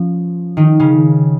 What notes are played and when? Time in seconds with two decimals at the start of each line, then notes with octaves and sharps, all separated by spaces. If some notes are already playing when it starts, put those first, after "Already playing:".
Already playing: F3 C#4
0.57 D#3 D#4
0.80 C#3 C#4